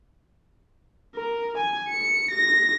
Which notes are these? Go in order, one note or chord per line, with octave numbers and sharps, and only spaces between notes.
A#4
G#5
C#7
A#6